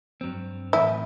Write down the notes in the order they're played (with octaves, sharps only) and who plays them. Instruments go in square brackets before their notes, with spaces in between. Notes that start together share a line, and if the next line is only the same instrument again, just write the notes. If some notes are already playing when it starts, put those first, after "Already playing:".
[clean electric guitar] G2 F#3 C4
[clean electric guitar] A2 E3 A3 C4 [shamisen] E4